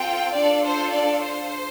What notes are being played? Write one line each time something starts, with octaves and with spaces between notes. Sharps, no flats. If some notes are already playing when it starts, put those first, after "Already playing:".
Already playing: C4 F4 A4 G5
D4 F4 A4 D5
C5
D5
C5